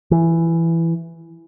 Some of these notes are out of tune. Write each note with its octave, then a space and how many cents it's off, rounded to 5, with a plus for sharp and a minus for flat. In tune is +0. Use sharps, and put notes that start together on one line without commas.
E3 +10